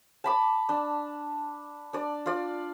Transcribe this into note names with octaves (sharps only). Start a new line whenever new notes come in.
A5 B5 D6
D4
D4 D5
F4 D5